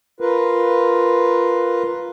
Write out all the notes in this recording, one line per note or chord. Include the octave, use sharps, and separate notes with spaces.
F4 A#4 B4